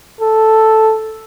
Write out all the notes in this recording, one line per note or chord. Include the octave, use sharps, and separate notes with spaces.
A4